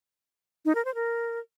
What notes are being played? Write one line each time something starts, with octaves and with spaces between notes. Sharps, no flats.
D#4
A#4
C5
A#4